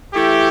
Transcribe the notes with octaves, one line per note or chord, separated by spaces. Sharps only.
E3 A3 E4 G4